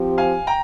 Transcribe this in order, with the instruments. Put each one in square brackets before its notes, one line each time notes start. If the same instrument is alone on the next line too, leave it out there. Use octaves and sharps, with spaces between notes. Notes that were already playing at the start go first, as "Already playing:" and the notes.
Already playing: [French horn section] F3 C4 G4
[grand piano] F5 G#5
G5 A#5